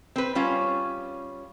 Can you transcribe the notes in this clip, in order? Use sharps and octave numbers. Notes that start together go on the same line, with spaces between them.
C4 B4
G3 C#4 F4 C#5